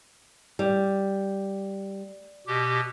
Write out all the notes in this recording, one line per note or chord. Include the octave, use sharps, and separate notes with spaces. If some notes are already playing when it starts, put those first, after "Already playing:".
G3
B2 G4